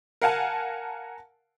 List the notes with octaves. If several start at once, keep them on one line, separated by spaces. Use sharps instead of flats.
A#4 F5 F#5 G#5 A5